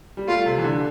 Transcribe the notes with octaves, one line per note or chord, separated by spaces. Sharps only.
G3
A3 F4
C3
E3
D3